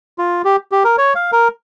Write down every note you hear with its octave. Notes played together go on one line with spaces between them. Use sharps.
F4
G4
G4
A#4
C#5
F5
A#4